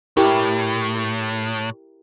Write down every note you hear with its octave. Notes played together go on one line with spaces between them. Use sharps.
A2 E4 G4 A#4